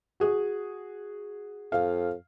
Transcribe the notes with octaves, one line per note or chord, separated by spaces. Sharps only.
F#4 G#4
F2 F5